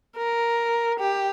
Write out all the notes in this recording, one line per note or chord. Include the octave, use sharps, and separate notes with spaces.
A#4
G4